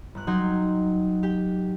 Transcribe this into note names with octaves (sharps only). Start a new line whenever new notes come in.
G1 F#6
F#3 D#4 F#5 G5 C6 G#6
G4 G5